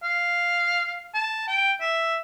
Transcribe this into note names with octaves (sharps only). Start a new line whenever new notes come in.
F5
A5
G5
E5